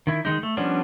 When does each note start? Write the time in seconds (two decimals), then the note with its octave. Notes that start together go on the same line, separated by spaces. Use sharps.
0.07 D#3 E4
0.25 D#3 G#3 D#4
0.43 A3
0.57 F3 G3 B3 C#4 D4